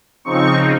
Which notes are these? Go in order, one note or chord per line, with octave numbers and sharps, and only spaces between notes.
C#3 F3 C4 D#4 C#6